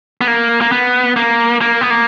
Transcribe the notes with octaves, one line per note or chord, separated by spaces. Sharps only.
B3
A#3
A#3
B3
A#3
A#3
B3
A#3